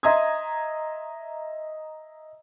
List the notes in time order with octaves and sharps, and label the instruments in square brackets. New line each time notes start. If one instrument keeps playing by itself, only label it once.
[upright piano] D#5 E5 A#5 C6 D#6 G#6